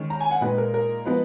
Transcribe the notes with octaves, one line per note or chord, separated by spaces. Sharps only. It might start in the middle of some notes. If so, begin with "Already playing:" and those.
Already playing: D#3 G#3 C#4
A#5
G#5
F#5
A#2 G#3 D#4 B4
A#4
A#4
F3 G#3 B3 D#4 B4